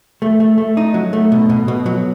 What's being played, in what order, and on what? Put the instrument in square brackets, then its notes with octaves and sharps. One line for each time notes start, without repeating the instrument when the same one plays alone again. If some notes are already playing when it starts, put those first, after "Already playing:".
[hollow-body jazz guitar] A3
A3
A3
D#4
F#3
A3
B2
B2
B2
F#3